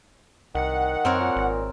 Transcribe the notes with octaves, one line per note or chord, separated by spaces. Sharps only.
C2 D#3 F#5
F#2 C4 A#4 C#5
A#2
G#1